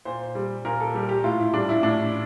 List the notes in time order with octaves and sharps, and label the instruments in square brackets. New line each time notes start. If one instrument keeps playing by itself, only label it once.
[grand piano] A#2 C5
G3
A#2 A#4
A4
G3 G4
G4
A2 F4
E4
G3 D4
E4
A2 D4